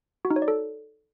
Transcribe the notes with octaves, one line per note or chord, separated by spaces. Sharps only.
F#4
D#4
C#5
D5
A4